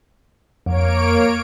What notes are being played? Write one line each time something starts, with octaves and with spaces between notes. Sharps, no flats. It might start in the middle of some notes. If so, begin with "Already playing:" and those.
F2 A#3 C#5 D7